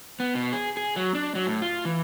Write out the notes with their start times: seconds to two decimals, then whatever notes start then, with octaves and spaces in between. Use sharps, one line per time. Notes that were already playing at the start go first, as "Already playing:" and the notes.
0.20 B3
0.35 B2
0.52 G#4
0.77 G#4
0.96 F#3
1.15 D4
1.35 F#3
1.47 A2
1.62 F4
1.85 E3